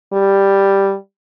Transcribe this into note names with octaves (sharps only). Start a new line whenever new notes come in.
G3